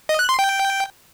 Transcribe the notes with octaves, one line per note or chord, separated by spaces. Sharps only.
D#5
F#6
C6
G5